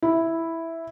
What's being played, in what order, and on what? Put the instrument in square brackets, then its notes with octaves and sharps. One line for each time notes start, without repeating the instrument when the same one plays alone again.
[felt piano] E4